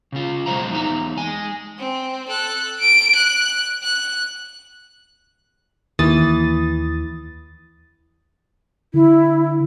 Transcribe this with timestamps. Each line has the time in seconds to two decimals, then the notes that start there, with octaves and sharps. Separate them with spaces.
0.12 C#3 F4
0.46 B2 F#3 G#3 C5 F5 A#5
0.71 E2 D#4 F4 A#5
1.17 G#3 G#5
1.78 C4
2.28 A4 F#6
2.79 D7
3.14 F#6
3.82 F#6
5.99 D#2 E3 D#6 A6
8.94 D3 E4